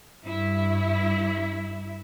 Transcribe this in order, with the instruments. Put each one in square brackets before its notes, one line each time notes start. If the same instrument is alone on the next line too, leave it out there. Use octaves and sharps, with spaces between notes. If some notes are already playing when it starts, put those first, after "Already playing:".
[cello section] G2 E4